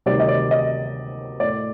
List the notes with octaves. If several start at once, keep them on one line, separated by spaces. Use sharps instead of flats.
D2 C3 D#3 G3 D5
D#5
D5
D#5
A2 A3 D5